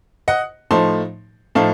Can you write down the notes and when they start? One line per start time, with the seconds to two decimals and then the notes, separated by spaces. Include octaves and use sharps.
0.28 D#5 F#5
0.71 A2 F3 A3 D#4 A5 C6
1.55 A2 F3 A3 D#4 F5 A5